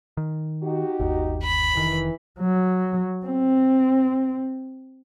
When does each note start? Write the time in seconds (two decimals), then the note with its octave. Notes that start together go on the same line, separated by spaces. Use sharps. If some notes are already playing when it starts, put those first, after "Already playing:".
0.17 D#3
0.63 D#4 F#4 G4
1.00 G1 D#2
1.43 B5
1.75 F1 D#3 E3
2.39 F#3
3.26 C4